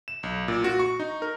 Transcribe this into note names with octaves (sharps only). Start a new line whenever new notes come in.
E7
B1
A#2
F#4
C#6
D#4
A#4